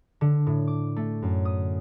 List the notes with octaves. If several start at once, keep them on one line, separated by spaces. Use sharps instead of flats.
D3
A2
D6
A3
F#2
D#6